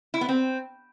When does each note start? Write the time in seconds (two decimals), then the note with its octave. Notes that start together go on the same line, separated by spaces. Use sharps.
0.14 E4
0.21 B3
0.29 C4